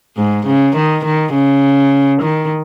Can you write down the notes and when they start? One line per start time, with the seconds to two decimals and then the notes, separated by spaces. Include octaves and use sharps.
0.17 G#2
0.46 C#3
0.76 D#3
1.05 D#3
1.34 C#3
2.22 D#3